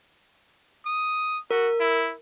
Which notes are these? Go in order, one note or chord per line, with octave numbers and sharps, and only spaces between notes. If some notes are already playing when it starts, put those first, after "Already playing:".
D#6
F#4 A#4
E4